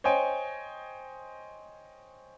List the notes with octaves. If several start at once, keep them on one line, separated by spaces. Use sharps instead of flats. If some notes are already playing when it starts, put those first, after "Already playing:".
C5 C#5 D#5 G5 G#5